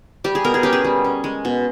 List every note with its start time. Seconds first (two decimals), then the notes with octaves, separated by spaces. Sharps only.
0.24 G3 G4
0.35 G#4
0.44 B2 A#4
0.54 G#4
0.63 C#4 G4
0.73 G#4
0.84 G3
1.04 C#4
1.24 G#3
1.45 B2